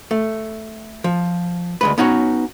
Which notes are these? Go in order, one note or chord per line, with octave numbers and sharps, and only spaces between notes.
A3
F3
D2 G#3 B4
B3 C#4 D#4 F#4 C#5